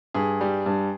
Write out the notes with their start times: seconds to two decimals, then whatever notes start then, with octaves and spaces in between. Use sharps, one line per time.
0.14 G2 G#4
0.41 G3
0.66 G2